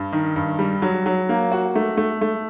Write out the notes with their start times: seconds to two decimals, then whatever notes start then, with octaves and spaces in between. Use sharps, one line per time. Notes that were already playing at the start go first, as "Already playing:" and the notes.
Already playing: G2
0.13 D#3
0.36 G2
0.59 G3
0.82 F#3
1.06 F#3
1.29 A#3
1.52 F#4
1.75 A3
1.97 A3
2.21 A3